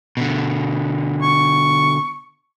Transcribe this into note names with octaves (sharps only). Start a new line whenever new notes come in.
B2 D3
C#6